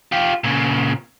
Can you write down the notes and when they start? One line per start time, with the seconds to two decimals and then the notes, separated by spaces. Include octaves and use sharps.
0.12 F4 G4
0.44 A#2 C#3